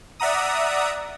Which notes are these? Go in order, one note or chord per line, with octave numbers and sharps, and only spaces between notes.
D5 E5 F#5 A#5 D#6